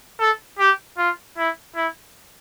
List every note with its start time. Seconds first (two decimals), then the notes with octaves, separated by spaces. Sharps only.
0.19 A4
0.59 G4
0.98 F4
1.38 E4
1.76 E4